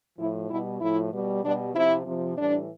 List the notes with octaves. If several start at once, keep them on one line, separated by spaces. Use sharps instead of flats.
A2 F3 E4
B2 G3 E4
A2 F3 E4
B2 G3
B2 G3 D4
C3 F3 E4
C3 F3
A2 E3 G3 D4